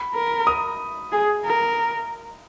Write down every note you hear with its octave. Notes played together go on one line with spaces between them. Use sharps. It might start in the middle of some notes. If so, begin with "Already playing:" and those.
Already playing: B5
A#4
D#6
G#4
A#4